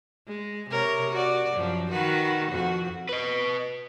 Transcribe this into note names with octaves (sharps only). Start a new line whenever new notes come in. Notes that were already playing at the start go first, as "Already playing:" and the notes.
G#3
C3 A#4 C#5
F#4 D5
F#2 F3
D#3 F#4 B4
F2 F#4
B4 D#5